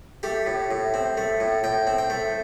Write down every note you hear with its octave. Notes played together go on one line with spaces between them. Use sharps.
A3 G4
A2
A2
C4
A3
A2
A2 G5
C4
G5
A3